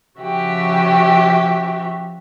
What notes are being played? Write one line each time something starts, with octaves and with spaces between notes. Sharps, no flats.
C#3 F3 F#4 G4 E5